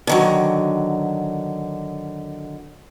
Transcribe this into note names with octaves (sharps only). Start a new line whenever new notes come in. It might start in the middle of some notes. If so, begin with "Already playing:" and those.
D3 D#3 F#3